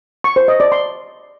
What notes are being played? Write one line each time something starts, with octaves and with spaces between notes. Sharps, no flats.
C#6
C5
D#5
D5
C6